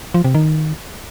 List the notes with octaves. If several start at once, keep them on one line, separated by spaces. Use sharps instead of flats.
F3
C3
D#3